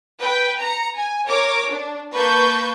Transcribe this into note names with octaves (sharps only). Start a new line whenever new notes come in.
B4 G5
A#5 C#7
G#5
A#4 C#5 D6
D4
A#3 B4 A5 C#6 G6